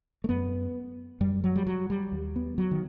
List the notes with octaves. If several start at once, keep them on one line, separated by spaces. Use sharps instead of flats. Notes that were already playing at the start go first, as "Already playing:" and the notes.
A3
F#2 B3
F#2 G3
F#3
G3
F#3
G3
D#2
B3
F#3
D#3